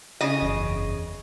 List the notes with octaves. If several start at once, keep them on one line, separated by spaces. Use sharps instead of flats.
C#3 D#5
F#1 E2